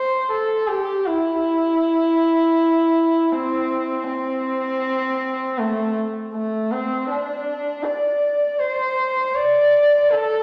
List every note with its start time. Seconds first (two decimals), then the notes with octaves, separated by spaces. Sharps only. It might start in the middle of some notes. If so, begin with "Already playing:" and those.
Already playing: C5
0.31 A4
0.69 G4
1.06 E4
3.32 C4
4.08 C4
5.59 A3
6.34 A3
6.72 C4
7.10 D4
7.84 D5
8.59 C5
9.35 D5
10.10 A4